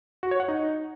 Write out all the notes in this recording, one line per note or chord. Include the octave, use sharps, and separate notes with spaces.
F#4
C#5
F#5
D#4